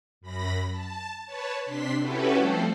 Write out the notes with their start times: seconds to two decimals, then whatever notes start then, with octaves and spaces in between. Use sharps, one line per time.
0.21 F#2 B5 A#6
0.71 A5
1.25 B4 C#5 A5
1.64 C3 D4 C6 B6
1.99 C#4 E4 F#4 G4 A4 B4
2.37 F3 G3 A3 C4 A4 C5